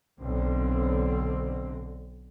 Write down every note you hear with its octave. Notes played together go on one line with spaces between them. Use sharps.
B1 D3 C4